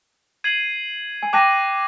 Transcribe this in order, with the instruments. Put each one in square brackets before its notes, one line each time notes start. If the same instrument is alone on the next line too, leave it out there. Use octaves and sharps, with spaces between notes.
[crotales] G#6 C7 D#7 F#7
[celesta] G#5
[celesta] G5 A5 [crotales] D6 F#6 A#6 D#7